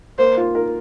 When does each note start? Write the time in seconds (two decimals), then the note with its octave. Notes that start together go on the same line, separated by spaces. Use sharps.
0.18 A#3 C5
0.37 F4
0.55 A#4